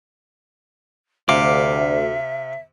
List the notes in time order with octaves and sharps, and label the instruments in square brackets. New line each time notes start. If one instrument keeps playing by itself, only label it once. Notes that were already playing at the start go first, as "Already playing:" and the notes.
[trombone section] D2 [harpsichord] C3 [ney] E5 [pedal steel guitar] F5 D6